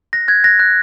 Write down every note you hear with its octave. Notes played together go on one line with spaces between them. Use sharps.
F#6 A#6
F#6 G#6
F#6 A#6
F#6